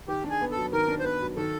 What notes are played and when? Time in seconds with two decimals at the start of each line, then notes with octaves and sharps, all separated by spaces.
0.08 D#3 G4
0.24 D4
0.30 G#4
0.41 B3
0.51 A4
0.56 F#3
0.73 D#3 A#4
0.88 D4
1.00 C5
1.04 B3 B4
1.21 F#3
1.37 D#3 A4